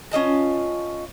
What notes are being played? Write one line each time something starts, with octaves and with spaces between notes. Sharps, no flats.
C#4 F4 D#5 A5